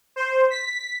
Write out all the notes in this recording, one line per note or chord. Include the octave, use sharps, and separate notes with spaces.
C5
B6